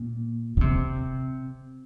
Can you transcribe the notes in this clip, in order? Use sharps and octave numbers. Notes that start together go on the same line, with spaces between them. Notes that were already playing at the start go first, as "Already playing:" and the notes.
Already playing: A#2
D3
C3